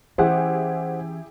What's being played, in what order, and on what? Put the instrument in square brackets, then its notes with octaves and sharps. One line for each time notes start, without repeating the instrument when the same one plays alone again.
[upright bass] E3 C#4 [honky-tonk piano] E4 G4 G#4 [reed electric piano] C5 F#5